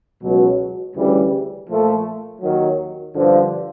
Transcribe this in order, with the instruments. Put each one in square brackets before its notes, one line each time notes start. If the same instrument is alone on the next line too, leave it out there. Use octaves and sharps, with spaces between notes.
[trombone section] C#2 B2 F#3
D2 C#3 E3 G3
A#2 F3 A3
D#2 D#3 F#3
G2 D3 F3